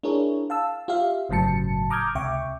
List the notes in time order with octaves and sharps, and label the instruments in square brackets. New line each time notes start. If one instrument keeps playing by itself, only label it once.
[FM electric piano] D4 E4 G#4 A#4 C#5
F5 A5 E6
F4 G4 E5 F5
G1 A2 C#3 F#3 A5 C#7
A#5 D6 D#6 F6 G6 G#6
C#2 C3 E5 G5 C#6 D6